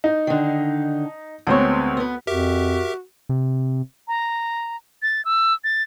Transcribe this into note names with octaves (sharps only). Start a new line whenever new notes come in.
D#4
D3 D#3
D2 G#3 B3 C4 C#5
B3 B4
F2 F#4 G4 A#4 E5
C3
A#5
A6
E6
A6